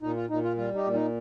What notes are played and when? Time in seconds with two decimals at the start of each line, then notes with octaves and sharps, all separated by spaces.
0.02 A#2 D#4
0.16 F4
0.29 A#2 D#4
0.44 F4
0.57 G3 F4
0.75 D#4 G4
0.84 A#2
0.94 D#4